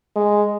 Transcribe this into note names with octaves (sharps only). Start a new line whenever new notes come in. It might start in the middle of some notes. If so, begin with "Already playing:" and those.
G#3